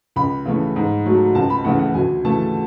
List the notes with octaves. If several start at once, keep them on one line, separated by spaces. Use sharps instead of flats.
C#2 B5
C#3 E3 A3
G#2
F#3 A3
C#2 A5
B5
C#3 E3 A3 F#5
F#5
D2 G#5
C#3 E3 A3 A5